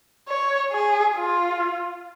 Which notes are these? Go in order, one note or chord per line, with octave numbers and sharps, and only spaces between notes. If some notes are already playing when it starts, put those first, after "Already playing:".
C#5
G#4
F4